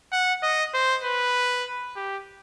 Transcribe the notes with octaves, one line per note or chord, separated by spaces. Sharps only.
F#5
D#5
C5
B4
G4